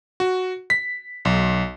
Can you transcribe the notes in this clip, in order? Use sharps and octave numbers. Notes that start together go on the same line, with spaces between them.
F#4
B6
B1